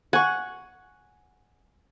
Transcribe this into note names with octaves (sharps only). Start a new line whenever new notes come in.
F#5 G#5 C#6